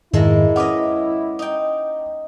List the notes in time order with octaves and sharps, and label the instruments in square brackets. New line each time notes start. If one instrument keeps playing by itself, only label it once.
[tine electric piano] F2 G#2 D#3 [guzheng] G#3 A#3 A4 [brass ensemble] E4
[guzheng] C#4 B4 D#5 [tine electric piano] F#5 D6
[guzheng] D#4 G5